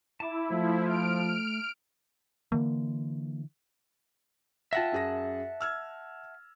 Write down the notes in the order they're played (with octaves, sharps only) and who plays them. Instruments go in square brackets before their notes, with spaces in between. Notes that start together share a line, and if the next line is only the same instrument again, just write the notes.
[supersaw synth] E4 [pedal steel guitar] A5 D6
[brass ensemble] F3 [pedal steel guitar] A3
[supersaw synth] F6 D7
[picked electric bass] D3 E3 [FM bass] A#3
[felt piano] F4 G5 A#6 [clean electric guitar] E5 F#5 A5
[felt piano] F#2 G#4 A#6
E6 F6 G#6